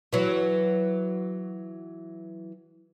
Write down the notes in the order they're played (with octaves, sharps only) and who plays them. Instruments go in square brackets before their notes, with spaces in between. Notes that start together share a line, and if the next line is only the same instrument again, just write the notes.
[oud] E3 F#3